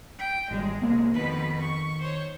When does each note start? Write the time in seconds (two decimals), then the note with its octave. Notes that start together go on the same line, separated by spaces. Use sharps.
0.18 G5
0.51 G#1 G3 G#3
0.82 C2 A#3 B3
1.14 F2 B2 D#3 B4
1.62 C#6
2.00 C5 C#5